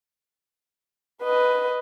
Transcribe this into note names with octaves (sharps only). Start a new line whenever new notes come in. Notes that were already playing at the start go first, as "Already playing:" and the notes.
B4 D#5